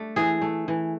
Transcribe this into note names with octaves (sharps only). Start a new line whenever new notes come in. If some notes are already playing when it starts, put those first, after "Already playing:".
Already playing: A3 D4
E3 G#4
A3
E3